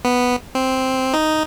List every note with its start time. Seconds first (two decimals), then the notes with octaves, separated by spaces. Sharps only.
0.05 B3
0.55 C4
1.14 D#4